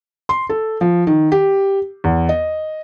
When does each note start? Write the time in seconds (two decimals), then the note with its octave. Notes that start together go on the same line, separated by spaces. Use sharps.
0.29 C6
0.49 A4
0.81 F3
1.07 D#3
1.32 G4
2.04 E2
2.29 D#5